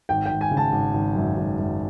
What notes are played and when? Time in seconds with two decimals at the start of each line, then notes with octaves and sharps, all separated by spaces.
0.09 G#1 G5
0.26 G#1 G5
0.41 G#5
0.51 C#3
0.57 A5
0.72 G#1
0.94 G#1
1.16 F#2
1.37 G#1
1.58 F#2